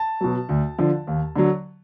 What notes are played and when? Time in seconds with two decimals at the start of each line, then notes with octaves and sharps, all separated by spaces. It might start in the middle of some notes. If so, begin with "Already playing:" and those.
Already playing: A5
0.21 B2 F#3
0.49 D2
0.79 D3 F3
1.07 D#2
1.36 D3 F#3